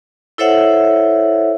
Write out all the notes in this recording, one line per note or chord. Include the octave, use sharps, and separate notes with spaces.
E4 A4 C5 C#5 E5 F#5